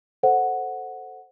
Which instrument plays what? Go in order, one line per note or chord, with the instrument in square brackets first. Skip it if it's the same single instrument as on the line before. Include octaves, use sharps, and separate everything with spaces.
[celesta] A4 C5 F#5